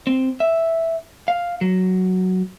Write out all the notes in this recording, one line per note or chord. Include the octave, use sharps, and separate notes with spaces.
C4
E5
F5
F#3